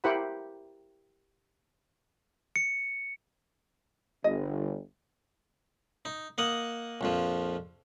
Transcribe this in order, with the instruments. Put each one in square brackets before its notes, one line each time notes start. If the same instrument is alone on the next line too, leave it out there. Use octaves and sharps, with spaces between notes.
[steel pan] E4 G4 A#4 C5 F#5 B5
[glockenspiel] C#7
[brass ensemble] G1 [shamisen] D#5
[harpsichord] D#4
A#3 D#5 F#5 D#6
A#1 F2 F3